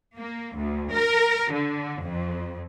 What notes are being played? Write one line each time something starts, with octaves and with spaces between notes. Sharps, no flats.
A#3
D2
A#4
D3
F2